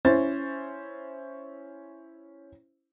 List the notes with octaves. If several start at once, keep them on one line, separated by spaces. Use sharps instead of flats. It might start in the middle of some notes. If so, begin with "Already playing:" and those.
C#4 E4 C5 A6